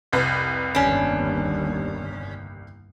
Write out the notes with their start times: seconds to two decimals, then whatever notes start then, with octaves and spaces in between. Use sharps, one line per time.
0.13 F1 C2 B4
0.75 G1 D#2 C#4 D4